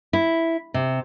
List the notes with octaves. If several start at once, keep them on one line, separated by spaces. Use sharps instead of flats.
E4
C3